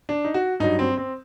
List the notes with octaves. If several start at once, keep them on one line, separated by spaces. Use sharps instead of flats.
D4
D#4
F#4
G2 F#3 D#4
C4
C4